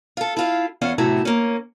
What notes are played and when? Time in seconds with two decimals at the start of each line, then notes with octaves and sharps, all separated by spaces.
0.17 F4 A4
0.37 E4 F4 F5
0.81 E2 C#4 F4 F#5
0.98 E2 A2 C3 F#3 A3 E4
1.25 A#3 C#4